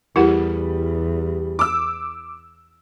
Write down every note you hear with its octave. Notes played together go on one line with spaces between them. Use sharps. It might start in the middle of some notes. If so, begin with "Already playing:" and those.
E2 G3 E4 A#4 F#5
D6 E6